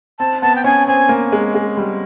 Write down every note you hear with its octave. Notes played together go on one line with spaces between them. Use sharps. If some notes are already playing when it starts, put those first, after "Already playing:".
C4 A5
B3 A5
G5
C#4 G#5
C4 G#5
A#3
G#3
G#3
G3